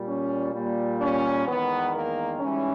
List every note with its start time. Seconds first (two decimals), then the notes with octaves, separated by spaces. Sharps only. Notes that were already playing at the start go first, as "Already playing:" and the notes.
Already playing: A#2 G3
0.08 C#4
0.54 A#2 G3
1.02 C#4
1.47 E2 D#3 G#3 B3
1.94 A#3
2.40 G#2 E3 G3 C#4